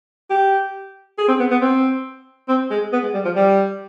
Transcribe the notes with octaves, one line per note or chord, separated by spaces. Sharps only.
G4
G#4
C4
B3
B3
C4
C4
G#3
B3
G#3
G3
F3
G3